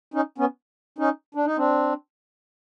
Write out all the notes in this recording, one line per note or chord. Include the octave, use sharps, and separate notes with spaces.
C#4 D#4
B3 C#4
C#4 D#4
D4
D#4
C4 D4